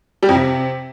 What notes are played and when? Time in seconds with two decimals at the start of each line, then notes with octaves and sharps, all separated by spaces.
0.23 G3
0.29 F2
0.35 C3